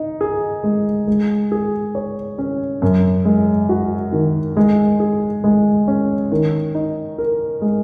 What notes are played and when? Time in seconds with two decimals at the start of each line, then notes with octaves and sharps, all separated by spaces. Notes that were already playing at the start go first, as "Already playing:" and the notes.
Already playing: D#4
0.21 G#4
0.64 G#3
1.07 G#3
1.52 G#4
1.95 C#5
2.38 C#4
2.82 F#2
3.25 G#3
3.69 F#4
4.12 D#3
4.57 G#3
5.00 G#4
5.44 G#3
5.88 C#4
6.32 D#3
6.75 D#4
7.18 A#4
7.62 G#3